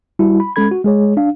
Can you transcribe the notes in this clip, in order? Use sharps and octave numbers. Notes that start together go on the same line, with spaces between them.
G3 E4 F#4
B5
G#3 C#4 A4 B5 G#6
F#4
G#3 G#4 C#5
D4 F5